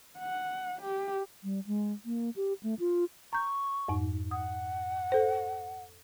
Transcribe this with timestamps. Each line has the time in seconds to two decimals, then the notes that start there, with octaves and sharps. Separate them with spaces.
0.18 F#5
0.81 G4
1.44 G3
1.67 G#3
2.05 A#3
2.36 G4
2.63 A3
2.79 F4
3.33 A#5 C#6 G6
3.88 F2 G#2 D#4
4.31 F#5 D#6
5.12 A4 C5